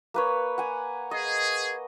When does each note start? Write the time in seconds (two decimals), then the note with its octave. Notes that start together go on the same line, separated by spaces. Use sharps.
0.14 A#3 B4 C#5
0.58 F#5 G#5
1.11 G#4 D#5